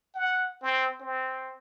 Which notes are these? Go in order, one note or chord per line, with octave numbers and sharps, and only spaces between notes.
F#5
C4
C4